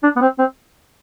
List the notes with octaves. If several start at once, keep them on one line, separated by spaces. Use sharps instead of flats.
D4
B3
C4
C4